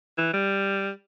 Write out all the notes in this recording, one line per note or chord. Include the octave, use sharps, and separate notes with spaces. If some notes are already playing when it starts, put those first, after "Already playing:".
E3
G3